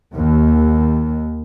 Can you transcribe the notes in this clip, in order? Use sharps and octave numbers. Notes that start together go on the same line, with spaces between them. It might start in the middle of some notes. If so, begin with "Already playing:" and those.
D#2